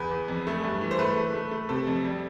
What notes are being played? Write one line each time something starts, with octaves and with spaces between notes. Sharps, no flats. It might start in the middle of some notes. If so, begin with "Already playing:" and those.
Already playing: E2 B4
E2
F2
A3
G2
E3
C5
A3 B4
A3
A3
A3
C3 A4
F2
G3